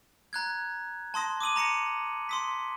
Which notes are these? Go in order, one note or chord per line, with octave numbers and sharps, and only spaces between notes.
A#5 F#6 G#6
A5 C6 D#6 A#6
D6 D#6 D#7 F#7
A#5 A#6 C#7 D#7
C6 D#6 B6